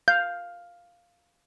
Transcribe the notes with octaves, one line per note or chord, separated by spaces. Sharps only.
F5 G6